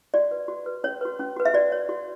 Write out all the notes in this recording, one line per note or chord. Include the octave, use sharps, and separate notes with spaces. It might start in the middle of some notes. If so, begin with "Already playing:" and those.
F#4 D5
B4
F#4
B4
C#4 C#5
F#4 B4
C#4
F#4 B4
E5
F#4 D5
C#5
F#4